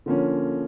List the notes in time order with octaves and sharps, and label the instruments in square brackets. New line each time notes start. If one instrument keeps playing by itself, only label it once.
[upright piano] D3 F3 A#3 C#4